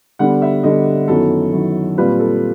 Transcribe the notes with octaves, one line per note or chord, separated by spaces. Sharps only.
D3 G3 B3 D4 F#5
E5
D3 G3 B3 D4 D#5
F#2 D#3 F#3 B3 E4 A4
F#2 D#3 F#3 B3 E4
A#2 G3 C4 F4 B4
A4